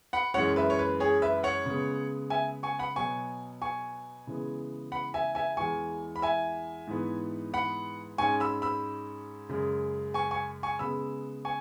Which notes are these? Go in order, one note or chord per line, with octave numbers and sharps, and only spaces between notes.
F#5 B5
F#2 E3 G#3 C#4 C#5 F#5
B4 E5
C#5
B4
G#4 C#5
B4 E5
C#5 F#5
C#3 G#3 B3
E5 G#5
G#5 C#6
F#5 B5
B2 F#3 B3 G#5 C#6
G#5 C#6
C#3 E3 G#3 B3
F#5 B5
E5 G#5
E5 G#5
E2 E3 G#3 G#5 C#6
B5
E5 G#5
G#2 E3 B3
F#5 B5
G#2 G#3 C#4 G#5 C#6
B5 E6
B5 E6
F#2 C#3 G#3
G#5 C#6
G#5 C#6
G#5 C#6
C#3 G#3 B3 B5 E6
G#5 C#6